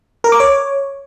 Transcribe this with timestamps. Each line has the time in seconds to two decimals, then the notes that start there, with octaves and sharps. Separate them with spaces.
0.24 A#4
0.32 D6
0.40 C#5